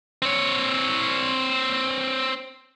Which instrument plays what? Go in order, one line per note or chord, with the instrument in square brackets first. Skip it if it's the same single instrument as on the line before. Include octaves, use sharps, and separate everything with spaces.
[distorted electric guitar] C4 C#5